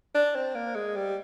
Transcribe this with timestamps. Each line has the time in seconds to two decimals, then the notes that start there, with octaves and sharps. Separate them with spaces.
0.15 D4
0.35 C4
0.55 A#3
0.75 G#3
0.96 G3